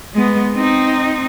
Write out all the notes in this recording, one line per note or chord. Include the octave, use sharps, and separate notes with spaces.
G#3 B3
C4 D#4